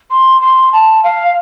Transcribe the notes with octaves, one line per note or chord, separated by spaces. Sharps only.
C6
C6
A5
F5